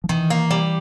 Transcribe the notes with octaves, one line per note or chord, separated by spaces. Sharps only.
F3
D#3 E3
A#3
G3